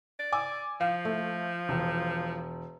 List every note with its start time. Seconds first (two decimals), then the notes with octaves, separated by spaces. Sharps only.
0.19 D5
0.32 G#5 D6 E6
0.81 F3 F5
1.05 A3
1.69 E1